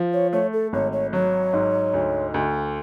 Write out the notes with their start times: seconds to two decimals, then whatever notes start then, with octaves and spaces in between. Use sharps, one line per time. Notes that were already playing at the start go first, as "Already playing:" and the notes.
Already playing: F3
0.13 C#5
0.33 A3 C#5
0.53 A4
0.73 G#1 C#5
0.93 C#5
1.13 F#3 C#5
1.53 G#2
1.94 D2
2.34 D2